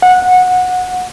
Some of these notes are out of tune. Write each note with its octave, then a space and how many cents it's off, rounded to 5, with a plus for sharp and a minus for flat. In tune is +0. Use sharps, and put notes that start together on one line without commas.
F#5 -15